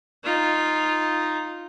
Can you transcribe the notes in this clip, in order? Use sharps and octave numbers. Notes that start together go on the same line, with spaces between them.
D#4 F4